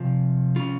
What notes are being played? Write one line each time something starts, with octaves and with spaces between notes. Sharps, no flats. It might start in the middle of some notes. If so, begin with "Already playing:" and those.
Already playing: C3 F3
C#4 F4